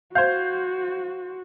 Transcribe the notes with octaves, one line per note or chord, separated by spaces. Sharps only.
F#4 C5 F5 G6 G#6